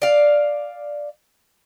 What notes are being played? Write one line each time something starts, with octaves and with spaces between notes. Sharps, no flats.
D5 F5